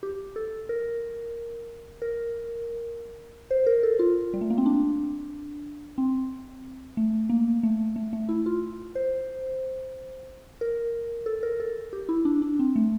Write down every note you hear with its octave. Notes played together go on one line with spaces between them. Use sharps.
G4
A4
A#4
A#4
C5
A#4
A4
F4
G3
A3
A#3
C4
D4
C4
A3
A#3
A3
A3
A3
E4
F4
C5
A#4
A4
A#4
A4
G4
E4
D4
D4
C4
A3